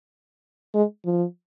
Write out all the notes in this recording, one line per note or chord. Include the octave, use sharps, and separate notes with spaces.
G#3
F3